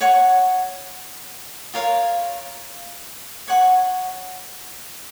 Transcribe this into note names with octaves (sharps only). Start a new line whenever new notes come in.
C#5 F#5 C#6
F4 A#4 C#5 F5
C#5 F#5 C#6